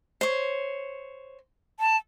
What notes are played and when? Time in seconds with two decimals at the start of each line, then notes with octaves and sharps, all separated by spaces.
0.21 C5 C#5
1.80 A5